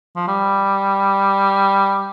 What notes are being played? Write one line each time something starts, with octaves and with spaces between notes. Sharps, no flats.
F3
G3